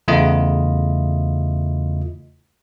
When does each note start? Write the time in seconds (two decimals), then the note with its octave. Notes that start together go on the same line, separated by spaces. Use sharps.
0.08 E2 C#3 A3 E4 F4 D#5